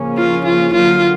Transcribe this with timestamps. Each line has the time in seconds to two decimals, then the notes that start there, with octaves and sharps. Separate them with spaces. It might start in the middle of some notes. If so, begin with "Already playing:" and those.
Already playing: C#3 F3 A#3 C#4
0.17 F4
0.45 F4
0.74 D3 F#3 A#3 F4